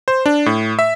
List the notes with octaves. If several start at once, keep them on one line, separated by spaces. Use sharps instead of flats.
C5
D4
A2
E5